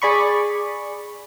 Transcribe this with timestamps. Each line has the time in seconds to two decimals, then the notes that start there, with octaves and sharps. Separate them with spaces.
0.02 G#4 D5 B5 C#6